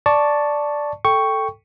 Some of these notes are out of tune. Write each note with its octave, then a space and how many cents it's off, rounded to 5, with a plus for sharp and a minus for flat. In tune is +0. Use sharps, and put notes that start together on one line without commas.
D5 +0 A5 +0 C#6 +0
A4 +0 G5 +0 C#6 +0